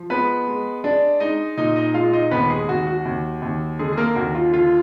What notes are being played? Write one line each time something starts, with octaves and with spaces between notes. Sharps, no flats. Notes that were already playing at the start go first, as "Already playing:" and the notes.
Already playing: F3
G#3 B3 B4
G#3
G#3 D4 D5
G#3 D#4 D#5
A#2 D#4 D#5
D#4 D#5
G#3 F4 F5
D#4 D#5
D#2 B3 B4
G#3 G#4
D#2 F#4
F#4
D#2
D#2
D3 G#3 G#4
G#4
A#3 A#4
D#2 F#4
F4
D3 F4